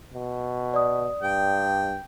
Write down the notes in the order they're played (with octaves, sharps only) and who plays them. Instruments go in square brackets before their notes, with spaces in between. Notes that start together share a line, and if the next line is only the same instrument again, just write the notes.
[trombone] B2
[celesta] D5 D#6
[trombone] G2 [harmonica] G5